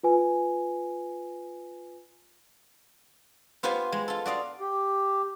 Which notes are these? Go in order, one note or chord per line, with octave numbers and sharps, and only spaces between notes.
F4 B4 G#5
B3 F4 G4 B4 C5 G#5
G#3
F4 A4
F#4 D5 D#5 F5
G4